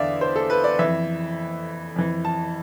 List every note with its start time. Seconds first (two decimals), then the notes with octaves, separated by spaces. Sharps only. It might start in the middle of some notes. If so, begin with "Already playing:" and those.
Already playing: E2 D3 D5 E5 F5
0.21 C5
0.36 A4
0.50 B4
0.64 D5
0.79 F2 E3 E5
1.96 F2 E3
2.25 A5